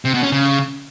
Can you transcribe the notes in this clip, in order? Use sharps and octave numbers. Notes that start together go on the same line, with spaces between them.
C3
B2
C#4
C#3